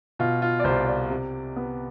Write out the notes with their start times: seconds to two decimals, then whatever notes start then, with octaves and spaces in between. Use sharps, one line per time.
0.19 B2 F4
0.42 F4
0.60 D5
0.64 C2 C5
0.88 D5
1.10 C3
1.56 B3